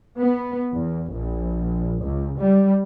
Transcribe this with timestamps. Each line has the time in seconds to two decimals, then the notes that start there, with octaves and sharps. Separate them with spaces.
0.19 B3
0.72 E2
1.11 A#1
2.02 C#2
2.39 G3